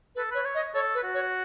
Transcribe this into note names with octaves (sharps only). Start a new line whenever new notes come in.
A4 B4
B4 C#5
C#5
D#5
A4 C#5
B4
F#4
C#5